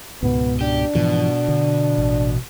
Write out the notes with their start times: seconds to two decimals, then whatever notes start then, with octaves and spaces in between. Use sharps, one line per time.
0.23 C#2 G#2 B2 B3
0.61 D4 G4
0.95 G#2 B2 E3 F3
1.48 D3
1.98 A1